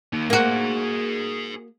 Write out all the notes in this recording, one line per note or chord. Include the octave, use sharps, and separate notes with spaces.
A#3 D#4
A#3 F#4 G#4 C5